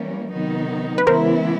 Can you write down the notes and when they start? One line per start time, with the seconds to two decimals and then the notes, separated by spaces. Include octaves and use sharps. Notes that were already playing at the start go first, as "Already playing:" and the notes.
Already playing: E3 G3 A#3 C#4
0.32 C3 D#3 F#3 B3 D#4
0.98 B4
1.06 C#3 E3 G#3 B3 E4 A#4 C5